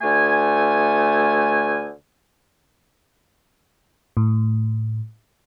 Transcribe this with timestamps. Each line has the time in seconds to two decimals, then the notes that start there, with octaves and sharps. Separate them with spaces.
0.01 D2 A3 G#5
4.17 A2